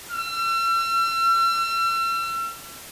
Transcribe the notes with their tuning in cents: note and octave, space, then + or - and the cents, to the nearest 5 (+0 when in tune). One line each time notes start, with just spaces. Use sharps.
E6 +45